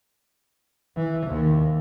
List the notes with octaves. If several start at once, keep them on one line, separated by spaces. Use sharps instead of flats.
E3
D#2